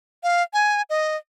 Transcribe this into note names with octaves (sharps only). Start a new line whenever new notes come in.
F5
G#5
D#5